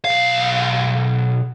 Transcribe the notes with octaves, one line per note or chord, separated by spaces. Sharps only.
B1 F5